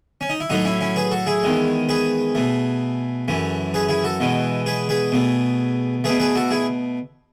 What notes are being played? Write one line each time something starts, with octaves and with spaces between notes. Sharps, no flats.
C#4
D#4
E4
A2 F#3 A3 D#4 F#4
C#4 E4
C#4 E4
G#4 B4
F#4 A4
E4 G#4
E2 D#3 G#3
G#4 B4
B2 A3
F#2 E3 A3
G#4 B4
E4 G#4
F#4 A4
E2 B2 G#3
G#4 B4
G#4 B4
B2 A3
B2 A3 G#4 B4
G#4 B4
F#4 A4
E4 G#4